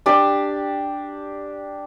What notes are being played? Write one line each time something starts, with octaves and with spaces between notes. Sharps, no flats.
D4 G4 D5 A5